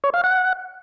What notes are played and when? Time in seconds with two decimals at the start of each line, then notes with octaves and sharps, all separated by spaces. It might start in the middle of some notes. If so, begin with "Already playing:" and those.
0.04 C#5
0.14 F5
0.24 F#5